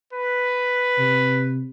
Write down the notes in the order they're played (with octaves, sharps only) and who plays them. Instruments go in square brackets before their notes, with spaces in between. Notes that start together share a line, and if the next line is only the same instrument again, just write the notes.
[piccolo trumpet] B4
[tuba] C3